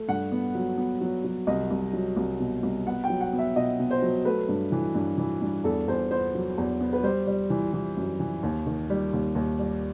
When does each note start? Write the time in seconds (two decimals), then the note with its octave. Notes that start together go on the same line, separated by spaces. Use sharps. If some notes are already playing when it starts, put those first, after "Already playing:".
Already playing: A3
0.08 G2 F#5
0.32 B3
0.55 F#3
0.78 B3
1.01 F#3
1.24 F#3
1.47 C2 D#5
1.71 C2
1.93 F#3
2.17 C2
2.40 B2
2.63 C2
2.87 B3 F#5
3.04 G5
3.10 F#3
3.21 F#5
3.33 B3
3.38 E5
3.56 B2 D#5
3.79 B2
3.91 C5
4.02 F#3
4.25 A3 B4
4.49 G2
4.72 E3
4.95 G2
5.18 E3
5.42 G2
5.64 E2 A4
5.88 E2 C5
6.11 B3 C5
6.35 F#3
6.58 E2
6.81 B3
6.93 B4
7.03 G3 C5
7.27 G3
7.50 E3
7.74 E3
7.97 F#2
8.20 E3
8.43 D#2
8.66 D#3
8.90 G3
9.13 D#2
9.35 D#2
9.59 G3